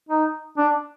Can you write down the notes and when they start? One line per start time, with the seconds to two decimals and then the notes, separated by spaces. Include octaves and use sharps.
0.09 D#4
0.58 D4